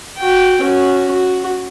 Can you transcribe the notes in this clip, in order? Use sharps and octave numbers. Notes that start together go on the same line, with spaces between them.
F#4 G5
C#4 F#4
F#4